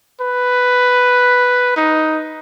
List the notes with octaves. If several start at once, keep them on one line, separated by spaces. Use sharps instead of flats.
B4
D#4